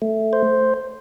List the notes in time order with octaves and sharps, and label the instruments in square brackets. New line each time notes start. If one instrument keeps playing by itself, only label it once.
[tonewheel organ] A3
C5